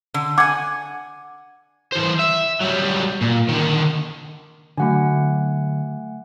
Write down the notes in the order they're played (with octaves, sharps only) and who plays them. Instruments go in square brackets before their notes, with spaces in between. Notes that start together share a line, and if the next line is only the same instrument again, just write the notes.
[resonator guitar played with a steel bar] D3
[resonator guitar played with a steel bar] F#5 G#5 [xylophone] D6 G#6
[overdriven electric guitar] E3 C5
E5
F#3 G3
A#2
D3 D#3
[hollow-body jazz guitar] D3 F#3 [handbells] A3 F#5 G#5